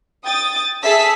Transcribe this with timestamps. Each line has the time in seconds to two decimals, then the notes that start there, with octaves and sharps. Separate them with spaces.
0.25 G5 D#6 A6
0.82 G#4 A4 E5 A5 E6 B6